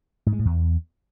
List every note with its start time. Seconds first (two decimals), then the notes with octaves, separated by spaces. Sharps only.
0.26 G#2
0.33 G#3
0.39 A2
0.45 E2